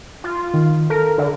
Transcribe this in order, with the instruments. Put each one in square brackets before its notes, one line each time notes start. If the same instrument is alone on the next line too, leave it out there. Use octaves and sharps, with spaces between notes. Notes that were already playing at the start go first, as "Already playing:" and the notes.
[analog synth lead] F4
[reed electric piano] D#3
[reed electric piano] A4 [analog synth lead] A#4
[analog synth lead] D3